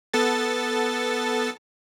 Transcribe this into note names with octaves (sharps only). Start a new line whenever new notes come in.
B3 A4 A6